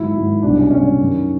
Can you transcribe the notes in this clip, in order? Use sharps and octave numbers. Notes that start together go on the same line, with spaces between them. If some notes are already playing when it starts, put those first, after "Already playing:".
Already playing: G#2 D#3 F#3 E4
G#2 D#3 F#3
C2 B2 F#3 D4
C#4
C2 B2 F#3 C#4
F#2 D#3 F#3